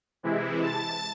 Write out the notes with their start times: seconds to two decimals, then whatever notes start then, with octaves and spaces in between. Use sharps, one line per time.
0.23 C3 E3 G#3 E4
0.62 A5 A6